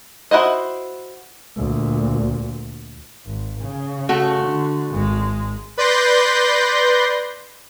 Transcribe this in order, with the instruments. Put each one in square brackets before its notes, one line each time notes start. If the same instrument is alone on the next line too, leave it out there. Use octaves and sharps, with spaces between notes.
[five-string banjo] E4 F#4 C5 D#5
[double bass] D2 A#2
G#1
C#3
[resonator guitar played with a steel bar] A3 F#4
[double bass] D3
G#1 G#3
[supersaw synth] B4 D5 C6 G6 A#6